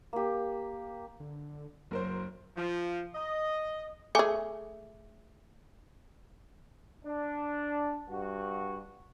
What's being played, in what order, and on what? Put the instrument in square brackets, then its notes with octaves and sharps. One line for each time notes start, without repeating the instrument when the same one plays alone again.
[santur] A#3 G4
[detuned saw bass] D3
[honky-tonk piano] F#1 A#4 C5 [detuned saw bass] F#3
[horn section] F3
D#5
[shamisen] A3 G#4 [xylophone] G#5 D6
[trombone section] D4
G2 F#4